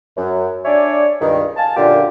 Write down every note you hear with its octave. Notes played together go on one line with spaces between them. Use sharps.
F#2
D4 C#5 D5 E5 G#5
C#2 G2 D#3
F5 G#5 A5
F#2 A#2 D3 F4 G4